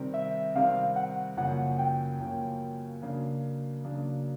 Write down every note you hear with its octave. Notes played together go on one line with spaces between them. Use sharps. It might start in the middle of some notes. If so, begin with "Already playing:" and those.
Already playing: C3 D#3 G3 C4
E5
C3 D#3 G3 C4 F5
F#5
F#2 C#3 F3 A#3 C#4 F#5
G5
F#2 C#3 F3 A#3 C#4
C#3 F#3 A#3 D4
C#3 F#3 A#3 D4